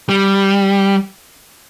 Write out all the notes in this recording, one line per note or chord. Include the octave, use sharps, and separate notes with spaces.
G3